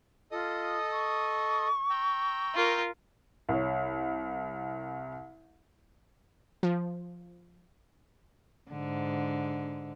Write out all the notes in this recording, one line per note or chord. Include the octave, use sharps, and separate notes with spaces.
F4 A4 D#5 D#6
C#6
G5 A#5 E6
F4 A#4
C2 C#5
F3
G#2 D3